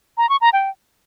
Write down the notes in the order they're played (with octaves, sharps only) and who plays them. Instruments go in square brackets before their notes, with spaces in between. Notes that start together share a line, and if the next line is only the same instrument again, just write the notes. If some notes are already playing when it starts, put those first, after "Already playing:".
[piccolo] A#5
C#6
A#5
G5